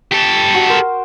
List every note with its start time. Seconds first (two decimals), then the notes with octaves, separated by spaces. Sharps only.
0.12 G4 A4
0.54 F#4
0.70 A#4 C5